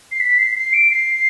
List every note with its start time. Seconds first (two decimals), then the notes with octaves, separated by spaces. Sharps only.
0.12 C7
0.20 B6
0.38 C7
0.56 C7
0.73 D7
0.91 C7